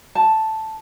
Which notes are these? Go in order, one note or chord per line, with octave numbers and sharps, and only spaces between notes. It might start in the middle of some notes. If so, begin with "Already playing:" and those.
A5